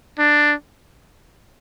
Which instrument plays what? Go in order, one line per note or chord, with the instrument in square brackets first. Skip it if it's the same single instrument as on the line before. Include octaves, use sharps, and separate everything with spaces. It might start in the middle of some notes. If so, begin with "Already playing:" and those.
[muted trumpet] D4